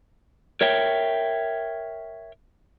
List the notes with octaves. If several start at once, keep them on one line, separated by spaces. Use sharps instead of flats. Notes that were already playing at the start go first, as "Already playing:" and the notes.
A#4 C#5 E5 G5